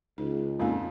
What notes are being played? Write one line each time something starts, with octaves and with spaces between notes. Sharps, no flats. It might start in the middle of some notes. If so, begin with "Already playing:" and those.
C#2 D#4
F2 A#2 G#3 C#4 D#4